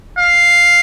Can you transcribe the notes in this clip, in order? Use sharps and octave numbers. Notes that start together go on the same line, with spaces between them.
F5